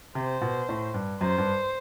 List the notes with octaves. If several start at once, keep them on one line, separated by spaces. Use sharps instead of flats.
C3 C5
B2
A2
G2
F#2 C5
G2